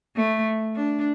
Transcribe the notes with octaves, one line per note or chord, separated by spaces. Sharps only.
A3
D4